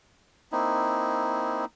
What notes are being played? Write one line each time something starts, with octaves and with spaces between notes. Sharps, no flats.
A#3 C4 D#4 E4